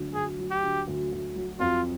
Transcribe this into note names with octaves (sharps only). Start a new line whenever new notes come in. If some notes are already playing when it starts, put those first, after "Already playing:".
Already playing: D2 D3 F#3
D2 G#4
F#3
G4
D3
D2
D2
F#3
F2 F4